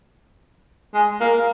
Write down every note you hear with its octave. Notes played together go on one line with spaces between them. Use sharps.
G#3
A#3